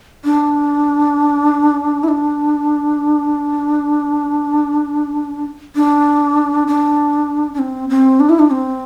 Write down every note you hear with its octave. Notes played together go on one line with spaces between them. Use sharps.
D4
E4
D4
D4
D4
D4
C4
C4
D4
E4
D4
C4